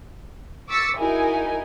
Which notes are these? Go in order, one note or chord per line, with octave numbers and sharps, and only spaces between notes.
C#6 D6 E6 A6 B6 C#7
D#4 E4 F#4 G#4 A#4 G#5